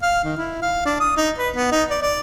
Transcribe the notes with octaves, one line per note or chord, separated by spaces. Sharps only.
F5
D#3
E4
F5
D4
D#6
D#4
B4
B3
D#4
D5
D5